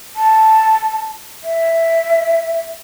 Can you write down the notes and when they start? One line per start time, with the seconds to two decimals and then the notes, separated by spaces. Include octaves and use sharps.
0.16 A5
1.44 E5